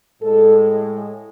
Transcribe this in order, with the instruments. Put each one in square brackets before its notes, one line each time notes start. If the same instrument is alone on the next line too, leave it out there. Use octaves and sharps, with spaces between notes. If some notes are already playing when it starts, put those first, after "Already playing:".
[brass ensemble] A2 G#3 A4